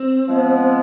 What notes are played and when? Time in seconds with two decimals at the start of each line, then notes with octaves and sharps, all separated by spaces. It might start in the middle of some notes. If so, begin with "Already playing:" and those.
Already playing: C4
0.27 F3 G#3 B3